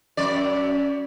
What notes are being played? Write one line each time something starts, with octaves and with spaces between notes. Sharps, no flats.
F#2 D5